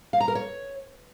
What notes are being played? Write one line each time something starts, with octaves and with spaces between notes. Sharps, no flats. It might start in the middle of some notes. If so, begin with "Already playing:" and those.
F5
A#5
A#4
C#5